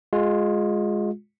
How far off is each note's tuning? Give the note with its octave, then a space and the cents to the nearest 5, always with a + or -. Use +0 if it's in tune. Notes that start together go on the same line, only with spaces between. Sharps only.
G#3 +0 F4 +25